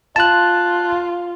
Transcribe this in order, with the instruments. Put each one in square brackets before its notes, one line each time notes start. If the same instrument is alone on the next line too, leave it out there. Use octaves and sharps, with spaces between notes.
[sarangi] F4 [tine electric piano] A5 F#6